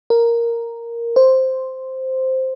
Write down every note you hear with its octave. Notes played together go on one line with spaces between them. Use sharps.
A#4
C5